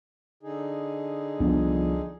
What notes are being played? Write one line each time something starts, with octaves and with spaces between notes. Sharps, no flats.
D3 D#4 G#4
C2 F3 B3 D4